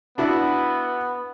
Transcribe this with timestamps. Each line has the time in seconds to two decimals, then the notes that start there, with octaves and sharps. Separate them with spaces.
0.18 B3 D4 E4 F#4